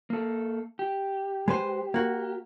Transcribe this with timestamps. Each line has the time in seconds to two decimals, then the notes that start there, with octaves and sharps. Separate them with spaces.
0.10 A#3 A4
0.79 G4
1.48 G#3 B4 C5
1.94 A#3 F#4